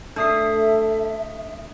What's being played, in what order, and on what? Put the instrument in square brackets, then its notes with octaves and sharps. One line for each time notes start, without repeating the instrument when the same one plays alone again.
[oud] A3 [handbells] D4 D#6 C7 [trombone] A4 [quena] E5